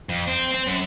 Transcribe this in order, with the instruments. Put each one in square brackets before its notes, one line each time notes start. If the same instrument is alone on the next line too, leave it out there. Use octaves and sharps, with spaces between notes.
[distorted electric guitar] F2
C4
C4
F#2